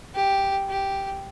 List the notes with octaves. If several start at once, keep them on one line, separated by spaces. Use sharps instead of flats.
G4
G4